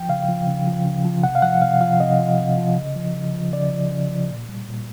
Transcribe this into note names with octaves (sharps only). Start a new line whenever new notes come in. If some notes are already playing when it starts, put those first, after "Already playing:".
Already playing: F3 G5
C#3 F5
F3
C#3
F3
C#3
F3
C3 F#5
F5
F3 F#5
C3 F5
F3 F5
C3 D#5
F3
C3
F3
C#3
F3
C#3
F3
C#3 D5
F3
C#3
F3
A#2
G3
A#2